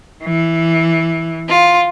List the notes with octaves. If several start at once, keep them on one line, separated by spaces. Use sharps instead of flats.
E3
F4